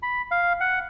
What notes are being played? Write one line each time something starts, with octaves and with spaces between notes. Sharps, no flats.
B5
F5
F#5